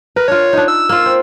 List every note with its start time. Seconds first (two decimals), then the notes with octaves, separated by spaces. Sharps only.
0.16 A#4 B4
0.28 D4 F4 C#5
0.53 D4 D#4
0.68 E6
0.89 A#3 F4 E6
1.06 C4